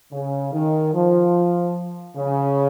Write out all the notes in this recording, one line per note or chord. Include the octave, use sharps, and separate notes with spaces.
C#3
D#3
F3
C#3